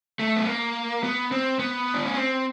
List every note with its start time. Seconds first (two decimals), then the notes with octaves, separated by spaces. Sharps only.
0.19 A3
0.36 B3
0.47 A#3
1.04 B3
1.32 C4
1.59 B3
1.94 D4
2.06 C#4
2.16 C4